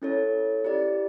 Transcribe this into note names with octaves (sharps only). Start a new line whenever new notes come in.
C#4 E4 A4 C#5
E4 G4 D5